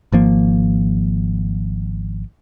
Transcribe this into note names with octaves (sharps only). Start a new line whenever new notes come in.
G#1 F3 A#3